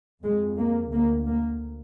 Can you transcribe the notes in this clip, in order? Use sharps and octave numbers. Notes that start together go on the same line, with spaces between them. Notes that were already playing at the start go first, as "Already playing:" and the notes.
F2 G#3
A#3
D2 A#3
A#3